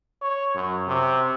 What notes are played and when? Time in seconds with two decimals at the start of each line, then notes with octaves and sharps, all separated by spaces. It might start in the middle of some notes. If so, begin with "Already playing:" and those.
0.22 C#5
0.55 F#2
0.88 C3